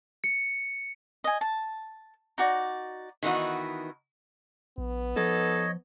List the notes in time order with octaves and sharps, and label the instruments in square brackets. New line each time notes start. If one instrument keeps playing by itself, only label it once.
[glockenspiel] C#7
[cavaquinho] D#5 G#5
A5
D#4 F#4 D5
[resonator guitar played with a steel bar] D#3 E3 B3 D#4 F#4
[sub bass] A#1 [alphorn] B3
[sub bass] F3 [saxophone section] D#4 A4 [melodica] C#5 D#5